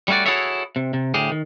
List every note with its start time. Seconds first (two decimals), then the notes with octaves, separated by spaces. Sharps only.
0.08 G3 A3 C#4 F#4 D5
0.26 E4 F#4 G#4 A4 C#5 E5
0.76 C3
0.93 C3
1.14 D2 A2 G4 G#4
1.31 D#3